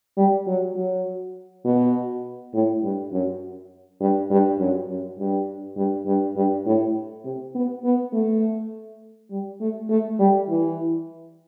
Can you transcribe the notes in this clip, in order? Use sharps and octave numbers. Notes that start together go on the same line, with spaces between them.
G3
F#3
F#3
B2
A2
G2
F#2
G2
G2
F#2
F#2
G2
G2
G2
G2
A2
C3
B3
B3
A3
G3
A3
A3
G3
E3